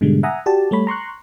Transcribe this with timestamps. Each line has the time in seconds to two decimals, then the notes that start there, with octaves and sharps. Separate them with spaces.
0.01 G#2 B2 D3 G3 G#3
0.23 E5 F#5 G#5 A#5 D#6
0.46 F#4 G4 D5 A5
0.71 G3 A3 C#5 B5
0.87 A#5 C6 C#6 F#6